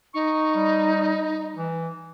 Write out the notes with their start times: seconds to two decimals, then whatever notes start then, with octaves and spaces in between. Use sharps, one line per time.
0.14 D#4 C#6
0.55 G3
1.56 E3